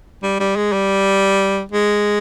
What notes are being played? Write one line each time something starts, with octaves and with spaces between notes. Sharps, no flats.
G3
G3
G#3
G3
G#3